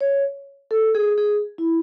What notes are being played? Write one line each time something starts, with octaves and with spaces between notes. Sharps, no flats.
C#5
A4
G#4
G#4
E4